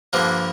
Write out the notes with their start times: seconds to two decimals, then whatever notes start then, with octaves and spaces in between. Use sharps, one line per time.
0.13 G2 D3 F3 A#3